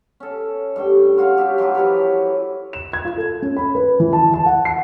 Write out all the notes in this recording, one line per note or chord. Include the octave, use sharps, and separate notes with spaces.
C#4 A4
G2 A3 G5
F4 F#4 C#5 F5
G4 E5 F5
E3 F#3 F4 G4
E3 F3 B4 C#5
E7
G#6
F4
A4
C#4
B5
B4
E3
A5
A5
F#5
C7